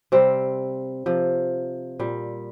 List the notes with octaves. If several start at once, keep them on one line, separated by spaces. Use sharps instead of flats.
C3 G3 C4
C3 F3
A#2 G3